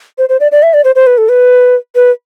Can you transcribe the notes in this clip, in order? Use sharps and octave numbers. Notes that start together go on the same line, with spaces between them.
C5
C5
D5
D5
E5
D5
C5
C5
B4
A4
B4
B4